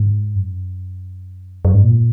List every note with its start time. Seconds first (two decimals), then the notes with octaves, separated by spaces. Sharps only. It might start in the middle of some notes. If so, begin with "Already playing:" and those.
Already playing: G#2
0.35 F#2
1.65 F#2
1.74 G#2
1.84 A#2